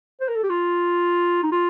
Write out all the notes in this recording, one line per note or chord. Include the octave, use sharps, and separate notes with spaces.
C5
A#4
A4
G4
F4
D#4
F4